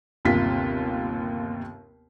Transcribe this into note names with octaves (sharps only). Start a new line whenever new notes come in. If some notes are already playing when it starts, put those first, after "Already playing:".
G1 D#2 C3 F4 B6